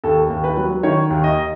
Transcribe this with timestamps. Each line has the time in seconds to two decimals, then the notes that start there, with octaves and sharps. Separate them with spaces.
0.04 D#2 A4
0.30 D#2
0.44 B4
0.57 F#3
0.83 D#3 C#5
1.10 D#2
1.24 D#5